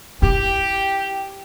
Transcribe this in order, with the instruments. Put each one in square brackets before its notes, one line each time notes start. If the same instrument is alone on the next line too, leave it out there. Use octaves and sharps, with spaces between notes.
[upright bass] E4 [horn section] G4